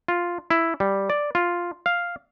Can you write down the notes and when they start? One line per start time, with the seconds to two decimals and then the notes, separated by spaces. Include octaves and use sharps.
0.08 F4
0.50 E4
0.80 G3
1.10 D5
1.35 F4
1.86 F5